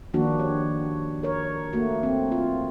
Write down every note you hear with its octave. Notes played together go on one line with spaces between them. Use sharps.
D#3 F3 A#3 D4 F#4
G4 C#5
A#4 C#5
A3 A#3 F#4
C4
F4